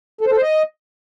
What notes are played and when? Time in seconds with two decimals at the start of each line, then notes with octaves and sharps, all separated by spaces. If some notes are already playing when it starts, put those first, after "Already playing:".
0.21 A4
0.26 C5
0.31 A4
0.37 C5
0.42 D#5